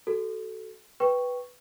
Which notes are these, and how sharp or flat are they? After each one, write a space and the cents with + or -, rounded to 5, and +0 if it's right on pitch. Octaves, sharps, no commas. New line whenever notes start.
F#4 +30 A4 +0
B4 +0 G5 -5 C#6 +0